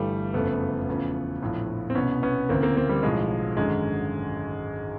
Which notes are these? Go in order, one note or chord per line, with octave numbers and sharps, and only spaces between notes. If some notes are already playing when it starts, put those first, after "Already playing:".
Already playing: G1 G2 E3 G3 A3
F#1 F2 C#3 A3 B3
E2 C#3 F3
A#1 A2 F3
C4
C2 B2 B3 C#4
B3 C#4
D2 C#3 E3 A#3 C4
A#3 C4
A#3 C4
G3
B1 A2 F3 G#3
G#1 F#2 D3 G#3